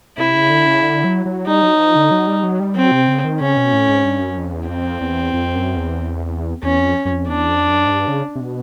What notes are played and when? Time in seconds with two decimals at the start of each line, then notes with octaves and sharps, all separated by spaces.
0.18 C3 E4
0.35 C#3
0.50 D3
0.67 C#3
0.83 D3
1.04 F#3
1.26 F#3
1.47 G3 D#4
1.63 F#3
1.79 F3
1.96 D3
2.11 F#3
2.27 G3
2.43 F#3
2.60 G3
2.76 F#3 C4
2.92 C3
3.08 C#3
3.24 D#3
3.41 C#3 C#4
3.57 B2
3.73 A2
3.89 G#2
4.05 G2
4.21 F#2
4.38 F2
4.53 E2
4.69 F2 C4
5.01 E2
5.34 F2
5.55 F#2
5.77 E2
6.63 E2 C#4
6.79 F2
7.05 F#2
7.11 F2
7.28 E2 D4
7.49 F2
7.70 F#2
7.86 G#2
7.91 G2
8.08 C#3
8.36 C3
8.40 B2